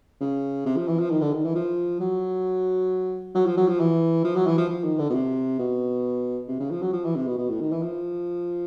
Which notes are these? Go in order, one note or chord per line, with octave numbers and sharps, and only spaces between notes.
C#3
C3
F3
E3
F3
D#3
D3
D#3
E3
F3
F#3
F#3
F3
F#3
F3
E3
F3
F#3
E3
F3
F3
D#3
D3
B2
C3
B2
C3
C#3
F3
F#3
F3
E3
C3
B2
B2
A2
D#3
E3
F3